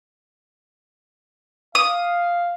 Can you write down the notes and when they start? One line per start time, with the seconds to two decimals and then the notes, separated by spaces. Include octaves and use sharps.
1.75 F5 D#6